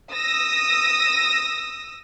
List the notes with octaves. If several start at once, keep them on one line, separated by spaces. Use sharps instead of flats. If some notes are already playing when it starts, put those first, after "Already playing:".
D#6 E6 A#6